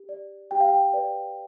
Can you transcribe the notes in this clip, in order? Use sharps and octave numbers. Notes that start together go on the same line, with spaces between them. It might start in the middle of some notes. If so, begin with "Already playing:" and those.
Already playing: G4
D5
G4 G5
F5
G5
B4 D5